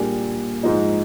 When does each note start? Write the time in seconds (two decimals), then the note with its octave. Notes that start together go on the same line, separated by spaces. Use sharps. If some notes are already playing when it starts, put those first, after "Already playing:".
Already playing: A#2 G3 D4 G#4
0.63 G#2 F3 G#3 D#4